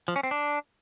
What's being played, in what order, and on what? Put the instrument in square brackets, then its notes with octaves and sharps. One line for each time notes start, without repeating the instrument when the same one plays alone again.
[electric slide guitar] F3
C#4
C4
D4